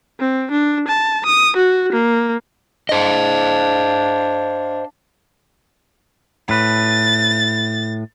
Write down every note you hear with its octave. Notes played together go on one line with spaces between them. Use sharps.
C4
D4
A5
D#6
F#4
A#3
D4 C5 D#5 F5
A2 B4 A6